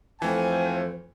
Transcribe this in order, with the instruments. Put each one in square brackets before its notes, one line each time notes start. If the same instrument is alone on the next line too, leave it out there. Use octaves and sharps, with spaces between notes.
[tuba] F2 [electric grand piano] E3 A3 [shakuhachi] C5 [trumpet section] F5 G5 G#5